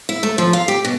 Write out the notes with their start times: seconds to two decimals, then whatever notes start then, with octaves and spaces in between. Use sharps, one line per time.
0.09 E4
0.23 A3
0.38 F3
0.53 F5
0.68 G4
0.85 B2